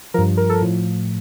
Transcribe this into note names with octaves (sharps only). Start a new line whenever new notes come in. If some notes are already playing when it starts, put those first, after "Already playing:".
G2 F3 A#4
A#4
A4
A2 F3